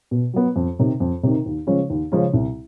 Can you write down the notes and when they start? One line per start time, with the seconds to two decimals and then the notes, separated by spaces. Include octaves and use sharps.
0.11 B2
0.34 F#3 B3
0.56 F2
0.79 C3 D#3
1.00 F2
1.23 C3 D#3
1.46 D#2
1.67 C#3 F3 G#3 C#4
1.90 D#2
2.12 C#3 F3 G#3 C#4
2.34 C2